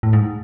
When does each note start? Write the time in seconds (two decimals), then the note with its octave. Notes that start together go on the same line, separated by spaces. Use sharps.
0.03 A2
0.13 G#2